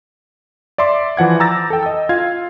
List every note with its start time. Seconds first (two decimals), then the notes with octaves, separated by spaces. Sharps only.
0.78 D5 E5 C6 D6
1.17 E3 F3 F#5 G#6
1.40 A#5 D6 E6 G6 A6 A#6
1.70 A4 G5
1.83 D#5 E6
2.09 F4 F5 G#6